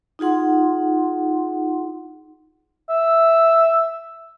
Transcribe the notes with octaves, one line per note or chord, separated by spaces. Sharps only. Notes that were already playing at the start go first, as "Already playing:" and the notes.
D#4 F4 G#4 F#5 C6
E5